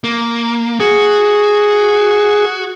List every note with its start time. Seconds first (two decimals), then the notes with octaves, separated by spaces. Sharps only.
0.04 A#3
0.80 F#4 G#4